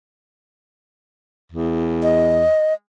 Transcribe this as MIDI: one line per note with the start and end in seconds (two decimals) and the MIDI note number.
1.52 2.47 40
2.03 2.74 75